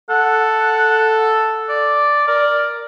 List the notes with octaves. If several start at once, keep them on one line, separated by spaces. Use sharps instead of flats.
A4 F#5
D5
A#4 D5